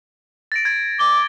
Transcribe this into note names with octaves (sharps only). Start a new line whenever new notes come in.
A6 A#6 D7
G#6 D7
D6 G7